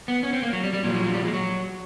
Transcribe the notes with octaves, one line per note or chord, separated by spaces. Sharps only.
B3
C#4
C4
A#3
F#3
G3
G3
A#2 F3 F#3
F#3
F#3
G3
G#3
F#3